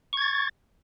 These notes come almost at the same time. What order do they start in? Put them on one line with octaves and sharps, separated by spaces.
C#6 G#6 A6